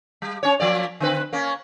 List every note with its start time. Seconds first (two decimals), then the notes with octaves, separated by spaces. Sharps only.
0.22 G3
0.43 C#4 C#5
0.60 F3 A#3 D5
1.00 D3 C4 B4
1.33 A#3 C#4